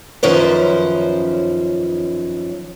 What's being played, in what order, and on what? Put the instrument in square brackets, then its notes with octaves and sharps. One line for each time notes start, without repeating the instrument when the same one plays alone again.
[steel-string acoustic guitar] F#2 D#3 F3 C#4 B4 C5